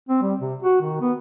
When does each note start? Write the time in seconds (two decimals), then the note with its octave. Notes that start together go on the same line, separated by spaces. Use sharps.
0.09 C4
0.22 G3
0.40 C3
0.63 F#4
0.82 D#3
1.01 B3